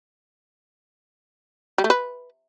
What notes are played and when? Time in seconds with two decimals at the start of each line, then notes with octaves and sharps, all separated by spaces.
1.78 G3
1.84 A3
1.90 B4